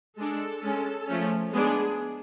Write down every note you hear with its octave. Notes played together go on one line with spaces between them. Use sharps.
G#3 D4 A4
G#3 C#4
F3 A3 C#4
G#3 B3 D4 G#4